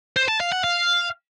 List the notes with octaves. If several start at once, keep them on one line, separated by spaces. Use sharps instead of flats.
C5
A5
F5
F#5
F5